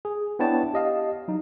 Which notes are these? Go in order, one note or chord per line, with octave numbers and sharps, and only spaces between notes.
G#4
B3 D4 E4 C#5 G5 A5
G4 D#5 F5
F#3 D#4